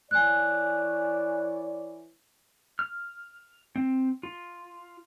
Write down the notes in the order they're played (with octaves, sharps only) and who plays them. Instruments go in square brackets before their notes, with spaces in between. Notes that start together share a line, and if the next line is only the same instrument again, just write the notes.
[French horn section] E3 C#5 D5 [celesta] G#5 F#6
[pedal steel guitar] F6
C4
F4